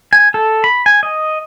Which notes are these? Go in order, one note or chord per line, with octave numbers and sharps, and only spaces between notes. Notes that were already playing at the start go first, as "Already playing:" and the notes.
G#5
A4
B5
G#5
D#5